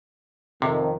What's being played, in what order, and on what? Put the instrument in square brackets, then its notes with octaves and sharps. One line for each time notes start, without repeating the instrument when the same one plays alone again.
[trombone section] F2 D#3 [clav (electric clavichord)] C3